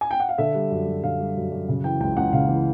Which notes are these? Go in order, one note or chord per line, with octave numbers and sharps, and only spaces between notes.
G#5
G5
F#5
F5
D3 E5
G3
F#2
F#2
D3 F5
G3
F#2
F#2
C#3
E3 G5
C#2 G5
C#2 F#5
C#3 F5
E3